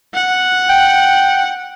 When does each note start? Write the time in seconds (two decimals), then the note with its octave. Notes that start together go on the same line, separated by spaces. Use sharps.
0.14 F#5
0.69 G5